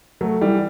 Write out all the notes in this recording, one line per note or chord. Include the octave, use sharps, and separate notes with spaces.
F#3 A3
E3 G3